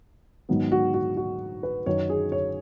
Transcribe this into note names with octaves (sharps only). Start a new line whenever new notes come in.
G#2 D#3 F#3 B3
F#4
F#4
F#4
B4
F#2 D#3 F#3 C#4 C#5
G#4
C#5